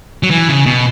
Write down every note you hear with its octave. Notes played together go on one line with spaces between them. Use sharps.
F#3
E3
C#3
B2